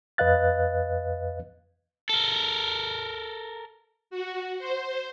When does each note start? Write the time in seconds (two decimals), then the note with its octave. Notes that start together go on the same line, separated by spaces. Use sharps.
0.18 F2 B4 D#5 F5 F#6 A6
2.10 A4 A#4
4.10 F#4
4.59 C5